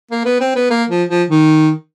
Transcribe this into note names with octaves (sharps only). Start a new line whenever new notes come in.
A#3
B3
C4
B3
A#3
F3
F3
D#3